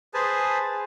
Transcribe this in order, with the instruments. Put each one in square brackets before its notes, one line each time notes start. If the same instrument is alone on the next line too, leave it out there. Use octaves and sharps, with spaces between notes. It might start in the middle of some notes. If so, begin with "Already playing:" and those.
[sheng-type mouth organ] G#4 B4 C5 G#5 A5